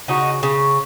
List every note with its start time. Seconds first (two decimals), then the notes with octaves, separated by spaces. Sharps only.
0.08 C#3 D#4 F#4
0.43 C#3